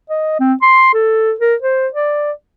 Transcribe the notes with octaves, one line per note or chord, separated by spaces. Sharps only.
D#5
C4
C6
A4
A#4
C5
D5